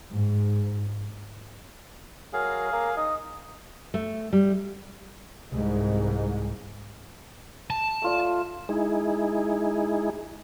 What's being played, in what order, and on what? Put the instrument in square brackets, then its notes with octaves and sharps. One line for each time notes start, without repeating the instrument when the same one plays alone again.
[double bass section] G#2
[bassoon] F#3 [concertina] G#4 F5 [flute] A#4
[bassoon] A#3 [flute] A#5
[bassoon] D#4 [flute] D#6
[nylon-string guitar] A3
G3
[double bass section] C2 G#2
[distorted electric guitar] A5
[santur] A3 F4 D5
[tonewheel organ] G#3 D#4 E4 G#4